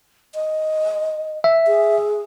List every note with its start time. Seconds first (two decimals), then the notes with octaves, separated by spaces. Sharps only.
0.35 D#5
1.44 E5
1.67 G#4